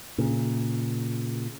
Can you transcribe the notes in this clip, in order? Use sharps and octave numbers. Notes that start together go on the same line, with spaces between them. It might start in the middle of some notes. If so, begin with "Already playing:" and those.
A#2 C#3